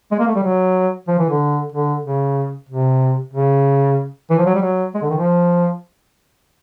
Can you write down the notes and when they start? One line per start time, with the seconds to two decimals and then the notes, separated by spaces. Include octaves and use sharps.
0.12 G#3
0.20 A#3
0.28 A3
0.36 G3
0.44 F#3
1.08 F3
1.19 E3
1.30 D3
1.72 D3
2.04 C#3
2.69 C3
3.34 C#3
4.30 E3
4.38 F3
4.46 F#3
4.55 G3
4.62 F#3
4.95 G#3
5.02 D3
5.10 D#3
5.18 F3